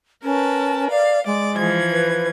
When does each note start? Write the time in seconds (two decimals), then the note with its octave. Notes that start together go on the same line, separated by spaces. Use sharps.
0.24 C#4 A#4 B4 A5
0.90 D5 F5
1.26 G#3 D5
1.56 E3 F3 G#6
1.92 B4